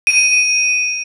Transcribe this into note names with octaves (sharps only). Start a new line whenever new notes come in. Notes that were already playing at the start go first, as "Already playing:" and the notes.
D#7